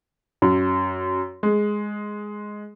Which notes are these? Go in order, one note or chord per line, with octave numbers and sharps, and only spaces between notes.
F#2
G#3